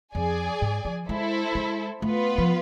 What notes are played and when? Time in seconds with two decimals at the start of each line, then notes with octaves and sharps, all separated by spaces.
0.14 F2 G#4 D5 G#5
0.62 G#2
0.85 F3
1.09 G#3 E4 A4 C5
1.55 G#3
2.02 A3 B3 F4 B4
2.38 F3